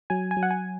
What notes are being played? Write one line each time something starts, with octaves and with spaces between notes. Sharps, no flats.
F#3 G#5
G#5
F#3
F#5
G#5